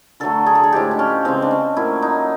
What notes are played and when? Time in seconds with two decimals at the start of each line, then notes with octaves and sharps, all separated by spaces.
0.20 D3 F#3 A3 A4
0.46 G#4
0.55 A4
0.63 G#4
0.73 A2 F3 G#3 G4
0.91 D4
0.99 C#4
1.25 C#3 E3 G#3 C4
1.42 D4
1.51 C#4
1.76 A#2 F#3 A3 E4
2.02 D#4